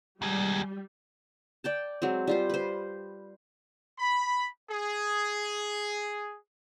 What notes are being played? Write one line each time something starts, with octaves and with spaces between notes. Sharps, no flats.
D#2 G3 G#3
D5 G5 A5
F#3 G#3 C4
G3 F4 C5
B4 C5
B5
G#4